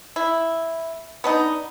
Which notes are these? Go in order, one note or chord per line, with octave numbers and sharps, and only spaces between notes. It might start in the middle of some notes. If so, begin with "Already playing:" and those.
E4
B3 D4 D#4